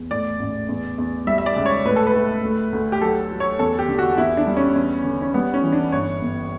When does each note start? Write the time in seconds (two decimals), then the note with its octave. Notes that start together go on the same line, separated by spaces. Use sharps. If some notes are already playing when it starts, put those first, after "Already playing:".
Already playing: E2
0.11 A2 D5
0.39 A1
0.69 E2
0.98 E2
1.27 G3 E5
1.38 E5
1.46 D5
1.56 C#2
1.66 C#5
1.85 A2 B4
1.96 A4
2.07 B4
2.14 A3
2.43 D2
2.73 D2
2.92 G4
3.01 F#3 A4
3.31 F#3
3.40 C#5
3.59 E2 A4
3.79 G4
3.89 D3
3.99 F#4
4.18 E2 E4
4.37 D4
4.47 G3
4.57 C#4
4.76 E2
5.04 D3
5.22 C#4
5.34 G3 B3
5.54 C#4
5.63 E3
5.72 D4
5.92 G1 C#5
6.21 G1